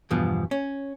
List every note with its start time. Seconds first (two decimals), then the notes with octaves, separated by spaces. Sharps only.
0.11 E2 G2 B2 F3
0.51 C#4